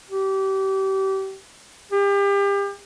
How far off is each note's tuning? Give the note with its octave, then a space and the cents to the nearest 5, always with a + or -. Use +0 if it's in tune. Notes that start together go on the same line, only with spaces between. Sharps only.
G4 -30
G4 +35